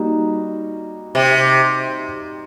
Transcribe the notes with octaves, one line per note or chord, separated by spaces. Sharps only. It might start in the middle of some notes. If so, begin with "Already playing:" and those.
Already playing: G3 A#3 D#4 F#4
C3